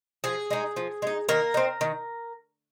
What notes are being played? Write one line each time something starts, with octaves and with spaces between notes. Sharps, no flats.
F3 G#4
G#3 D#4
F3
G#3 D#4
D#3 A#3 A#4
C4 D#4
D#3